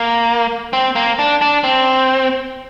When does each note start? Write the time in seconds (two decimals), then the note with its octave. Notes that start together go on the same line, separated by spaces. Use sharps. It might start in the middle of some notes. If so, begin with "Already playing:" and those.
Already playing: A#3
0.73 C4
0.96 A#3
1.19 D4
1.41 D4
1.64 C4